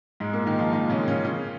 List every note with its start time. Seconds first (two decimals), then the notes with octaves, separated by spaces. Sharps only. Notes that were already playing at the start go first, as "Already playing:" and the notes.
0.20 G#2 G#3
0.33 A#2 A#3
0.46 D#3 D#4
0.59 F3 F4
0.72 D#3 D#4
0.89 C#3 C#4
1.08 C#3 C#4
1.24 C#3 C#4